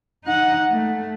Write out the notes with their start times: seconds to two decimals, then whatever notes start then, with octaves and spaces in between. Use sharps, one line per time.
0.24 D#4 F#5
0.71 A3